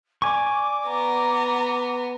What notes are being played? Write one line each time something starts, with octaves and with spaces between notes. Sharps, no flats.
D5 G#5 C#6 D6
B3 A#5